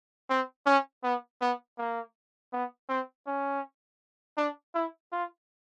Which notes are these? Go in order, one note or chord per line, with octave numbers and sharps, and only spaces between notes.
C4
C#4
B3
B3
A#3
B3
C4
C#4
D4
E4
F4